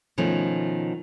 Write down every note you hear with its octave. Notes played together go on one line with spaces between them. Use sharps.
B2 D#3 F3 A3 C#4